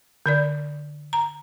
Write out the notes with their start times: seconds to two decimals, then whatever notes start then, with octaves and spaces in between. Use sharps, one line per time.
0.26 D3 A#4 D5
1.13 A#5